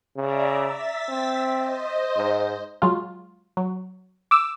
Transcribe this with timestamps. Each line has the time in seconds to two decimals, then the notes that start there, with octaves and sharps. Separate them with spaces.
0.17 C#3 D5 E5 A#5
0.62 E5 A6 B6
1.09 C4
1.54 C5 D#5
2.17 G#2
2.82 F#3 G#3 F4
3.57 F#3
4.31 D6 E6